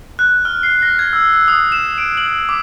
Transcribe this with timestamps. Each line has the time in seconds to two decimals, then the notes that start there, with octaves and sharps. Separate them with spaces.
0.19 F#6
0.45 F6
0.63 C7
0.82 A#6
0.99 G#6
1.13 E6
1.33 E6
1.48 D#6
1.72 E7
1.98 D7
2.17 F#7
2.49 D6